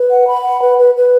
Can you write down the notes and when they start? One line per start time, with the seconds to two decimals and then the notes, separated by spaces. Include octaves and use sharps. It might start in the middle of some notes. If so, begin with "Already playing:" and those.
Already playing: B4
0.10 F#5
0.27 B5
0.43 F#5
0.61 B4
0.79 B4
0.96 B4